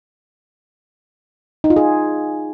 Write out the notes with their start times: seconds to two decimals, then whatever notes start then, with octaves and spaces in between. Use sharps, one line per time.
1.64 D#4
1.70 F4
1.76 G#4